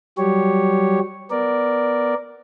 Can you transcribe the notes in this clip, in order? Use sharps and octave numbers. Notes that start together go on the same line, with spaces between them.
F#3 G3 G4 C#5
B3 A#4 D5